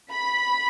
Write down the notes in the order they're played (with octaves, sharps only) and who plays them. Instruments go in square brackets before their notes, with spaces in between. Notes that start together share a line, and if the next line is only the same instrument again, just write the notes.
[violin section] B5